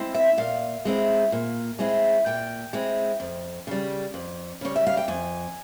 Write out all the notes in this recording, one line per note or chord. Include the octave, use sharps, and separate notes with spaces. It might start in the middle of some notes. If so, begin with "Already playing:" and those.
Already playing: G#3 C4 E4
E5
A#2 F5
G#3 C4 E4
A#2
G#3 C4 E4
A#2 G5
G#3 C4 E4
F2
C#3 G3
F2
C#3 G3 C#5
E5
F5
G5
F2 G#5